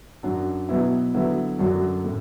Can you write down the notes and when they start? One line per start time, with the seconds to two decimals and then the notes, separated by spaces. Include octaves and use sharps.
0.23 F#2 F#3 D4 F#4
0.69 B2 F#3 B3 E4
1.14 D3 F#3 B3 E4
1.59 F#2 D3 F#3 D4 F#4
2.05 A2